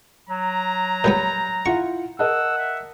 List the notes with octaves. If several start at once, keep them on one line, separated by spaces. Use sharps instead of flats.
F#3 A#5
A#2 G3 B3 C#5 B5 G6
E4 F4 F#5 C#6
A#4 D#5 F#5 A5 E6
E5